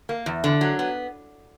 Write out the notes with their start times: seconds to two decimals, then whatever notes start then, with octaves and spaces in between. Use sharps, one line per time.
0.09 A#3
0.26 E2
0.44 D3
0.61 F#3
0.79 B3